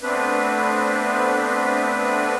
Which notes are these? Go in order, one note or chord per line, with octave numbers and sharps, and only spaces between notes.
A3 B3 C4 D4 B4